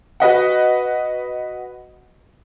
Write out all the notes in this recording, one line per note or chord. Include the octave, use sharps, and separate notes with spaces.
F#4 B4 D#5 F#5